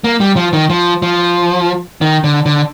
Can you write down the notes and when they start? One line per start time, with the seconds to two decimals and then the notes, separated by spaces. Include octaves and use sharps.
0.04 A#3
0.20 G3
0.36 F3
0.53 D#3
0.70 F3
1.02 F3
2.01 D#3
2.24 D3
2.46 D3